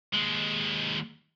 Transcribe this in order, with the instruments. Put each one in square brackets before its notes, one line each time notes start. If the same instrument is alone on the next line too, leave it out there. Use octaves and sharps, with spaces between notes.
[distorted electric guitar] D#2 G#3